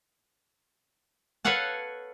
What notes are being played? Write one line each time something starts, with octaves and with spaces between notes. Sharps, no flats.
A4 B4 C#5 F5 F#5 A5